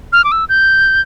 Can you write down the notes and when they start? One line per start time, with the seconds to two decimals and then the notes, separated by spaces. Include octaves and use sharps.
0.13 F6
0.24 D6
0.32 E6
0.49 G6